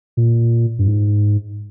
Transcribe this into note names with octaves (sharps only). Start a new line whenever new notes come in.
A#2
G2
G#2